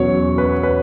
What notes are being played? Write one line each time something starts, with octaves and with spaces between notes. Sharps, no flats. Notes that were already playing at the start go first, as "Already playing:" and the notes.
Already playing: E2 B2 F#3 C#4 C#5
B4
B4